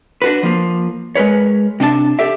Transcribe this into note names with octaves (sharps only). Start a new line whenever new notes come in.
D4 F#4 B4
F3 A#3
G#3 A#4 B4 C#5
C3 D4 D#5 A5
G4 A4 D5 E5